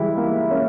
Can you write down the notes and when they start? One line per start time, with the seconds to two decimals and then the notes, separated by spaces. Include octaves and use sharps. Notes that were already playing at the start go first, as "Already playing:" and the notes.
Already playing: E3 F3 G3 G#3 E4
0.17 G3 A#3
0.50 A#3 C#4